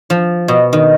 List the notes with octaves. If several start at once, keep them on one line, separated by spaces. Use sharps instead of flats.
F3
B2
D#3